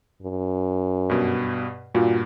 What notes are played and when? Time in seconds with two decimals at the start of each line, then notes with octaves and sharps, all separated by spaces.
0.22 F#2
1.10 G2 B2
1.95 G2 A#2 F4 F#4